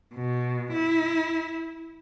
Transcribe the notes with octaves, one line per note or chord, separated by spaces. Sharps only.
B2
E4